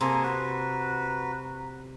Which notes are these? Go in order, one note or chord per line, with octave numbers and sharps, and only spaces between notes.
C3 A#3 G#4 A4 A#5 C6
F#4 B4 A#5 F6 C7